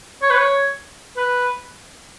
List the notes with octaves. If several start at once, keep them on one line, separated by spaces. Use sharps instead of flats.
C#5
B4
C#5
B4